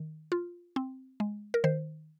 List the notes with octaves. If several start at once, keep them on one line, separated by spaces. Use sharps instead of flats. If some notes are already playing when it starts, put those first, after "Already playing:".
Already playing: D#3
F4
C4
G#3
A#4
D#3 C5